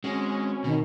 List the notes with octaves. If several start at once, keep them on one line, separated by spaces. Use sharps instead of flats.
G#3 C4 C#4 F#4
B2 D#3